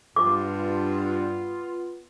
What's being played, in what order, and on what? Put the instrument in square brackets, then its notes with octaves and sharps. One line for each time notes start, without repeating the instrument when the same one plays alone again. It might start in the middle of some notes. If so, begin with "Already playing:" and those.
[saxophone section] G2 [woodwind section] B3 F4 [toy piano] D6